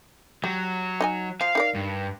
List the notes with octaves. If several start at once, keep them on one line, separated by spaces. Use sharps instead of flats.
F#3 G3
D#4 D#5 G#5
F3 F5
D#4 A#4 D5
G2